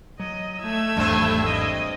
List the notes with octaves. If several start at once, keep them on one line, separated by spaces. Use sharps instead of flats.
F#3 D#5
A3 E5 E6 G#6
G#1 E2 G2 F#3 C4
D#5